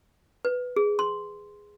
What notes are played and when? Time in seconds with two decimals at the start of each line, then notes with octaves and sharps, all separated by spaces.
0.45 B4
0.76 G#4
0.99 C6